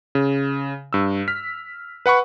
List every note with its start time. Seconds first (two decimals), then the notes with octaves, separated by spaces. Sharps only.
0.15 C#3
0.93 G2 E6
1.28 F6 B6
2.06 B4 F#5 B5 C#6